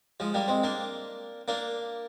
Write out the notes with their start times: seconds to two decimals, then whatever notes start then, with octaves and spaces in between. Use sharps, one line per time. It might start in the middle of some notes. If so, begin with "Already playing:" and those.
0.20 F3 G#3
0.34 G3 A#3
0.48 G#3 C4
0.63 A#3 D4
1.48 A#3 D4